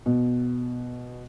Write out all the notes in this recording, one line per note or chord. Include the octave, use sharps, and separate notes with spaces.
B2